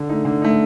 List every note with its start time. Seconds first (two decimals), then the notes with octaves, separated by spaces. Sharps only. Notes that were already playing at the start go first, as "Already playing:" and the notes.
Already playing: D3
0.09 A3 D#4
0.25 D3
0.42 A3 D#4